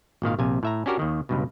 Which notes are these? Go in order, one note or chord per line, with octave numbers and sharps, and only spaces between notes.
G#1 A#2 D#3 F5
A#1 C3 F5 G#5
A2 E5 A#5
C#4 D4 F#4 G4 A#4
D#2 D#3
C#2 G2 B2